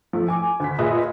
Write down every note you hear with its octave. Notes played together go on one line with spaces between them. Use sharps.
F3 A3
G#5 D6
D2 B6
A#2 G#4 B4 D#5 E5 D#6